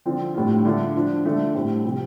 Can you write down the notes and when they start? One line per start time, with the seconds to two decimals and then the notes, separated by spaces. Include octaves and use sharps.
0.05 D3 F3 C4 F4
0.34 A2 G3 D4 F4
0.65 D3 A3 D4 F4
0.95 F3 D4 F4
1.25 D3 A3 F4
1.55 A2 G3 C4
1.84 C3 F3 C4